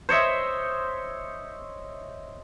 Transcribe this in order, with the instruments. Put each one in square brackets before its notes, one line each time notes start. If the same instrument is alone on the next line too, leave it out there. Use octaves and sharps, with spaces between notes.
[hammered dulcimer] C5 C#5 D#5 E5